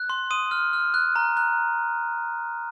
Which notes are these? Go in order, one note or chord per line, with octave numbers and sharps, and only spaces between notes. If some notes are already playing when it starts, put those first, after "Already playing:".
Already playing: F#6
C6
C6 D#6 D#7
F6
F6
F#6
A#5
F#6